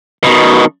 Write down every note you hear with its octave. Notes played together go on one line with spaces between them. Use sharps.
B2 D#3